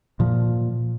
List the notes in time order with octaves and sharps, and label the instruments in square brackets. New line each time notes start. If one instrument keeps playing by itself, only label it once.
[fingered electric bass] A#2 F3